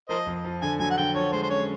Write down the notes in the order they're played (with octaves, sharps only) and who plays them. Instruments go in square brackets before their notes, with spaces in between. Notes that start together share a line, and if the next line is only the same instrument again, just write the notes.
[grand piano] F3 [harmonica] A#4 C5 D#5
[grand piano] F2
F3
[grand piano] D3 [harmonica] G#5
[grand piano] F#3 [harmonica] G#5
[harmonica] F#5
[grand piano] D3 [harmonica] G5
[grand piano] F3 [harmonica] C#5
[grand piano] G#3 [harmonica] C5
[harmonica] C5
[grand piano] C#4 [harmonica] C#5